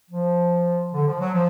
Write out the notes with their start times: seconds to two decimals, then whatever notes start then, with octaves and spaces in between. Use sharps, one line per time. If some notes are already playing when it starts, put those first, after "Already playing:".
0.10 F3
0.93 D3
1.06 F3
1.20 F#3
1.34 F3